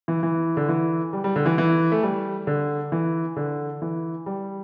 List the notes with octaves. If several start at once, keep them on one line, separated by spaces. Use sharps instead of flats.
E3
E3
D3
E3
G3
G3
D3
E3
E3
A3
G3
D3
E3
D3
E3
G3